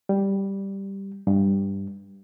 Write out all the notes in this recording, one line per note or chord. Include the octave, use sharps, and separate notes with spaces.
G3
G2